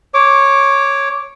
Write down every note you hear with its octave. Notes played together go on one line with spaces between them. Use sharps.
C#5 D6